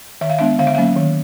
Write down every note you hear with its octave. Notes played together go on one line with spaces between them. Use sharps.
D#3 E5
F5
G#3 B3 D4 E5
D3 F5
E5
F#3 A#3 C#4 F5
D#3